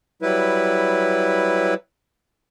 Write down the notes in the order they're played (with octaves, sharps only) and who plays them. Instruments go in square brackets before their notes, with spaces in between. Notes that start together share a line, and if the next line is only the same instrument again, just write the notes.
[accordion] F#3 G3 E4 B4